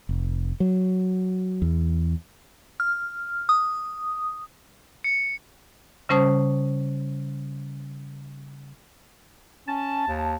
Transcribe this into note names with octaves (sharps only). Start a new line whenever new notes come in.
F1
F#3
E2
F6
D#6
C#7
C#3 G3 C#4 C5 A5 D#6
C#4 A5
D#2